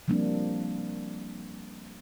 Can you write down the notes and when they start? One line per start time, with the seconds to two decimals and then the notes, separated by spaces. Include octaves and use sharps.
0.08 F3 G3 A#3 C4 D4